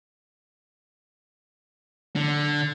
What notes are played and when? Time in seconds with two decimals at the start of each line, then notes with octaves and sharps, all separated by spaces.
2.16 D3